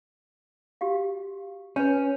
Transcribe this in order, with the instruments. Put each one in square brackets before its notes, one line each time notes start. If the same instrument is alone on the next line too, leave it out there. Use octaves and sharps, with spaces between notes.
[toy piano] F#4 G4 F5
[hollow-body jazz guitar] C#4 [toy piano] B4 C#5